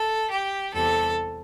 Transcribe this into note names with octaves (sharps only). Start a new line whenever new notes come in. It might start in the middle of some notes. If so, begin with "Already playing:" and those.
Already playing: A4
G4
E2 C3 G3 A4